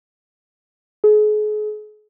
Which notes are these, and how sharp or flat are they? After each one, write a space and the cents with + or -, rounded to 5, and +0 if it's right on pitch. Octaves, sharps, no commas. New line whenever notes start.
G#4 +35